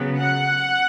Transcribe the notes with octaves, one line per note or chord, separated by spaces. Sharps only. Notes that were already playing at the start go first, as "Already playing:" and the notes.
Already playing: C#3 F#3 B3
F#5